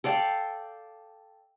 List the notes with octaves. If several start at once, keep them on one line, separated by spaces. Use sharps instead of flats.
A4 D5 F5 G5